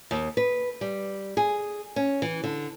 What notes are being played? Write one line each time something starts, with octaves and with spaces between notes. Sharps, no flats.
D#2
B4
G3
G#4
C#4
E3
D3